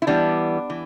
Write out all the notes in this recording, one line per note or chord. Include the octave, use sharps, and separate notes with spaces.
E4
E3 G3 B3 D4
E3